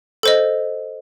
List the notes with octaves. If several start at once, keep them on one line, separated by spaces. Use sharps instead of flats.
A4 C5 D#5